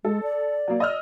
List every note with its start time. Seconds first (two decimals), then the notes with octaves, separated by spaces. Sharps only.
0.05 G#3 A4
0.23 D5
0.68 F#3 A#3
0.80 D#5 E6 F6